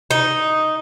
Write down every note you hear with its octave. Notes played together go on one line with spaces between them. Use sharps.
D#4